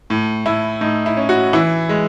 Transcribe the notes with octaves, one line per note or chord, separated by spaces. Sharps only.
A2
A2 E4
A2 D#4
E4
C#4
F#4
E3 E4
G#3